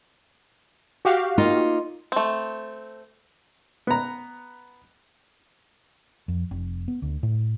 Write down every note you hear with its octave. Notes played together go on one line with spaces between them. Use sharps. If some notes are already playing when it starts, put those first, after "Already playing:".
F#4 G4 F5
A#3 D#4 F4
A3 C4
B3 A#5
F2
F1
B3
D2
A2